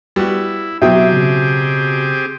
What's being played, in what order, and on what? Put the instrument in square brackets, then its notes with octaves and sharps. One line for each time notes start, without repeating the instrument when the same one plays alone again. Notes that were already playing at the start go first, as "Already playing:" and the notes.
[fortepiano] G3 B3 F#4 [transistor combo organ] E4
[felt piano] B2 F#3 [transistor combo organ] C4 G4 G#4 [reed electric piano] E5 [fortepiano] G5 D#6
[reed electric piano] C#3